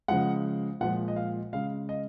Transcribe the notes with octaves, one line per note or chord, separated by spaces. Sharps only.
C#3 F3 G#3 F#5
A#2 F3 G#3 F#5
D#5
F5
C#3 G#3 F5
D#5